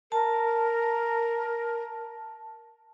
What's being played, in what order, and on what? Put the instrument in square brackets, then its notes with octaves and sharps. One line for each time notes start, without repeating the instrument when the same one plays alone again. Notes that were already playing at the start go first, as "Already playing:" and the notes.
[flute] A#4 [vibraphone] A5